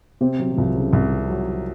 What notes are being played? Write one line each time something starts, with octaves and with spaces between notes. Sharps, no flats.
C3 C4
F#3
F#3
C2 F3
C#3
C2
F#3